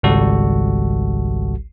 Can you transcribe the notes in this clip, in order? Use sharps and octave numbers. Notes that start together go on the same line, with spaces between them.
G#1 C#2 G3 F#4 A4